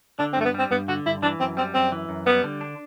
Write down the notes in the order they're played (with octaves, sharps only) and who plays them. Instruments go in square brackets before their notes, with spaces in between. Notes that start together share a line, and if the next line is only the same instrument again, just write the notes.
[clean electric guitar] D3 [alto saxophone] D4
[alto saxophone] C4
[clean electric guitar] G2 [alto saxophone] A3
[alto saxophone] B3
[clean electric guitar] G3 [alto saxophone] C4
[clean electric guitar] G2 [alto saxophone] B3
[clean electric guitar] D3 [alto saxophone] F#4
[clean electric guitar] G2 [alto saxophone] E4
[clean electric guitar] E3 [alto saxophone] D4
[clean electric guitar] F#2 [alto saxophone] C4
[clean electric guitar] G3 [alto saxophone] C4
[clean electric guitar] F#2 [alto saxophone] C4
[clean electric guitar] E3
F#2
[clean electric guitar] G3 [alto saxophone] B3
[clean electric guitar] D3
D4